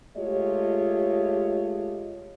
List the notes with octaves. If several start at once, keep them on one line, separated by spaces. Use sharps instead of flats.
G#3 A3 F4 G4 C#5 D#5